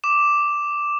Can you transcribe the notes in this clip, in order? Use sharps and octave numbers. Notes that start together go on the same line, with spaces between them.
D6 E7